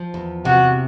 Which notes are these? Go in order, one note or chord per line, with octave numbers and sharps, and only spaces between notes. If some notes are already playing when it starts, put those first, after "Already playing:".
Already playing: F3
E2
C3 F#4